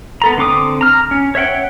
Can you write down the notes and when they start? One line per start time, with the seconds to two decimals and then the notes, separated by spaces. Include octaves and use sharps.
0.22 B3 A4 A#5
0.38 D3 C4 D6 D#6
0.81 A#5 F6
1.11 C#4
1.35 C#5 E5 F#5 G5